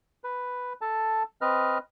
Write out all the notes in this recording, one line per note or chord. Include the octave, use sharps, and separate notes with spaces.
B4
A4 A5
C4 B4 D#5 F6